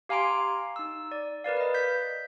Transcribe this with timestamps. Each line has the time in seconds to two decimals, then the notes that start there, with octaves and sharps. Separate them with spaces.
0.09 G4 F5 G#5 A#5 C6 D7
0.76 D#4 E6
1.12 D5
1.44 A#4 B4 D5 F5
1.57 B4 D#5
1.74 G6 B6